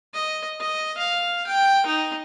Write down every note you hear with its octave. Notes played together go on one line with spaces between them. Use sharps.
D#5
D#5
F5
G5
D#4